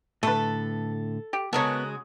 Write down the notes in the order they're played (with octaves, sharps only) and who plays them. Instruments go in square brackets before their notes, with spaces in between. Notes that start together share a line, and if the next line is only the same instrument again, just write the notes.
[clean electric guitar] A2 D3 [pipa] A3 B4 [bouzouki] A4
[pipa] G4
[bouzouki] C#3 G#3 F#4 [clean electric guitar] B3 [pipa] A4 A#4 C#5